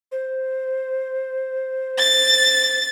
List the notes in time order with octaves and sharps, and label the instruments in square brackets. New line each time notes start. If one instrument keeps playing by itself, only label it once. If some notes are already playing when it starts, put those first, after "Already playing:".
[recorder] C5
[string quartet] A6